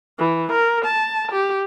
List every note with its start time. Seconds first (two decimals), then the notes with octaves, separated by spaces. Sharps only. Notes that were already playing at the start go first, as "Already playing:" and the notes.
0.19 E3
0.52 A#4
0.85 A5
1.32 G4